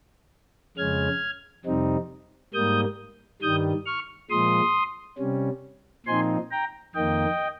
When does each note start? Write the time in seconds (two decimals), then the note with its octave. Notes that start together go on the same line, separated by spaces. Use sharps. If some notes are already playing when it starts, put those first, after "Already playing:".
0.77 F2 C#3 G#3 C#4 F6 G#6
1.65 F2 C3 G3 C4 D#4
2.54 G#2 G3 A#3 D#6 G6
3.42 G2 D#3 G3 D#6 G6
3.86 C#6 F6
4.30 A#2 F3 G#3 C6 D#6
5.18 C3 G3 C#4
6.06 A#2 F3 C4 D#4 G#5 C6
6.51 G5 A#5
6.95 F2 D#3 A#3 D#5 G5